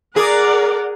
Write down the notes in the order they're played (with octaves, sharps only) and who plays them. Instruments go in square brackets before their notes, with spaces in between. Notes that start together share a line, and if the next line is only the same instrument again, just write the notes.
[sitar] G#4 [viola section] A#4 D5 F#5